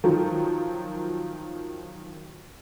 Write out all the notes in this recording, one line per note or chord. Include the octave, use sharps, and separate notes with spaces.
D#3 F3 F#3